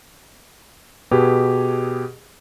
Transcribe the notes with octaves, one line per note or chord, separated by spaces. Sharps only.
B2 G4 G#4 B4